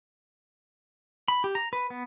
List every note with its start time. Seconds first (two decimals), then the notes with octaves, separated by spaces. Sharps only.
1.28 B5
1.44 G4
1.55 A#5
1.73 B4
1.90 B3